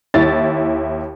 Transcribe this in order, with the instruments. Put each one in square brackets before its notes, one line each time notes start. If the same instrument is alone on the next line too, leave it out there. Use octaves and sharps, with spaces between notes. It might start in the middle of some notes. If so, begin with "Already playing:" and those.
[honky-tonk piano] D#2 E4 A6